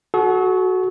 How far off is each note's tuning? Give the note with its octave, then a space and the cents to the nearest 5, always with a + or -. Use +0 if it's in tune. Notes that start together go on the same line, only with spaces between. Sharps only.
F#4 +0 A4 -45